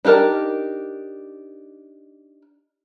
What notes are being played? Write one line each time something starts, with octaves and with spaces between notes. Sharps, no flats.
D4 D#4 G4 A#4 A5